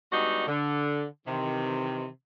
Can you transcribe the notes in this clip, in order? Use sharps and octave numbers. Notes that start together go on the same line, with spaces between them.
G3 G#3 B3 D4 D#4 F#4
D3
C3 D#3 E3